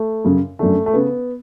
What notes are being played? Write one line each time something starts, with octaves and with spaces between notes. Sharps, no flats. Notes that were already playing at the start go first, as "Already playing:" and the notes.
Already playing: A3
F#2 C#3
F#2 D3 A3
A3
C#3 B3